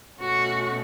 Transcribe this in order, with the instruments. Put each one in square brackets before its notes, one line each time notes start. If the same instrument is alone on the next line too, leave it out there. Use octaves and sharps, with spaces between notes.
[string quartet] B2 A3 C#4 F#4